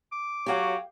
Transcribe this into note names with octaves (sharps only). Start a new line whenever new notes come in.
D6
F#3 G4 C#5 F5 G5